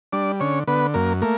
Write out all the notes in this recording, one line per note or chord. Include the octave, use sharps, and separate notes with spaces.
G3 D4 D5
D3 C#4 C#5
D3 B3 B4
F#2 A#3 A#4
A3 A#3 A#4